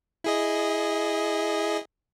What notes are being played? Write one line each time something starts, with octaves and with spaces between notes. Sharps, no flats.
E4 G#4 D#5